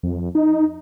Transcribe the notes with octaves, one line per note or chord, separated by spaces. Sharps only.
F2
D#4